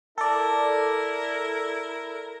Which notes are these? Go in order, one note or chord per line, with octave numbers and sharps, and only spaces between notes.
E4 A4 A#4 D5